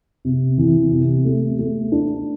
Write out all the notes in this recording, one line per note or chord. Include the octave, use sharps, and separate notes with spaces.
C3
E3
C3
A3
A3
D4